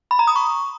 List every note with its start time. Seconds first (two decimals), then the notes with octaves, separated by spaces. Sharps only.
0.11 B5
0.19 A#5
0.27 D#6
0.36 C#6